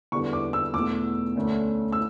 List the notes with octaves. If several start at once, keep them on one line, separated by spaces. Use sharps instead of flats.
E2 D3 G3 B3 C#6
D6
E6
E2 B2 A3 D6
D2 D3 A3 C#4
E6